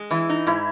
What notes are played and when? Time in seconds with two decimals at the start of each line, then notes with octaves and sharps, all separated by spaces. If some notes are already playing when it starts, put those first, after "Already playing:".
Already playing: G#3
0.11 E3 E4
0.30 D#4
0.47 G#2 E4